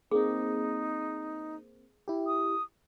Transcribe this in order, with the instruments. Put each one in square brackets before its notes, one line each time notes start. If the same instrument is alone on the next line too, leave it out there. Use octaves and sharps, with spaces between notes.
[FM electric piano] A#3 C4 [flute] D#4 [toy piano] G#4
[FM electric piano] E4 G4
[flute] D#6